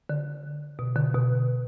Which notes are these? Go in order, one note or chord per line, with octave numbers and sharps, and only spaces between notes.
D3
B2
D3
B2